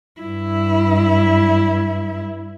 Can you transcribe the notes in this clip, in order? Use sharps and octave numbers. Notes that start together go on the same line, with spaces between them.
G2 E4